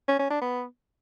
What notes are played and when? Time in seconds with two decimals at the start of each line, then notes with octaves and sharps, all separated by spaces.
0.08 C#4
0.19 C#4
0.30 D4
0.41 B3